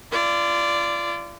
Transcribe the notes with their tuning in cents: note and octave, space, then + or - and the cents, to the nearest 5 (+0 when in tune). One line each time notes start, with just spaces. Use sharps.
F4 -35 D5 -5